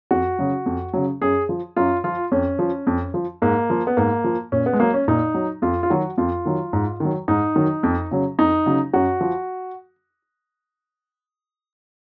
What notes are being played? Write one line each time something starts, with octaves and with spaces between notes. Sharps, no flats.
F2 F#4
C#3 F#3
F2
C#3 F#3
F#2 G#4
F3
F#2 F4
F3 F4
F2 C#4
F3
F2
F3
G#2 A#3
F3
B3
G#2 A#3
F3
A#2 C#4
B3
G#3
F#3 A#3
C#4
A#2 D#4
F#3
F2 F4
F4
D#3 F#3 F#4
F2 F4
D#3 F#3
G#2
D#3 F#3
G#2 D#4
D#3 F#3
F2
C#3 F#3
F2 D#4
C#3 F#3
F#2 F#4
F3